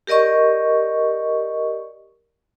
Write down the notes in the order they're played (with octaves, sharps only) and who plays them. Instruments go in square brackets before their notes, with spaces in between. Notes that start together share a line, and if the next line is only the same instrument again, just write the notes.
[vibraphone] G4 A#4 D5 D#5 C#6